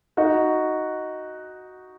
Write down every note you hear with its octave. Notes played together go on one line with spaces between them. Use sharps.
D#4 F#4